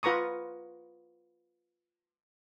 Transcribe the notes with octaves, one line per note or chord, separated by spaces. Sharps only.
F4 B4 A#5 C#6 D#6